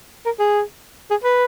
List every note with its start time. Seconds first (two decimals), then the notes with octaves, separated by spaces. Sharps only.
0.26 A#4
0.40 G#4
1.11 G#4
1.24 B4